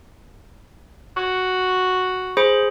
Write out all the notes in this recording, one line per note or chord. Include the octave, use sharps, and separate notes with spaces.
F#4
G#4 C5 B5